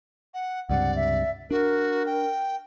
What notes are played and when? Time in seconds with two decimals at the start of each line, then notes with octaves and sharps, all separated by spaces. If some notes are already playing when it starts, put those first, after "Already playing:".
0.34 F#5
0.69 C#2 G2 C3 D5 F#5
0.96 E5
1.51 D4 F#4 A#4
2.06 G5